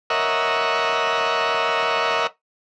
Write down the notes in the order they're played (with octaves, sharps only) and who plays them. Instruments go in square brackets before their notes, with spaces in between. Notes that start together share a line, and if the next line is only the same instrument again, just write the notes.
[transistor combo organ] A#4 C#5 D#5 E5 F#5